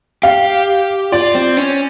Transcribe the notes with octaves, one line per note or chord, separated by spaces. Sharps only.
G4 F5
F4 D5
C4
C#4